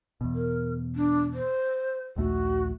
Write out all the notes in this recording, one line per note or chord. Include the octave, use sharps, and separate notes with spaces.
E2 B2
A#4
D4
C5
A#1 D#2 A3 F#4